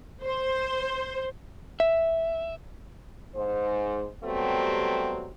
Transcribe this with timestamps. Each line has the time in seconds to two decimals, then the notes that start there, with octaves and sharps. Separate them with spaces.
0.22 C5
1.80 E5
3.35 G#2 C5
4.24 C3 F#3 G3 A3 B3 C4